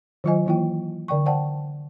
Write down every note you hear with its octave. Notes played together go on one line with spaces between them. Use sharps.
D#3 F#3 F4 C5 D#5 G#5
E3 A#3 E4 F4 G5
D3 D5 G5 C#6
C5 D5 F#5 G5 A5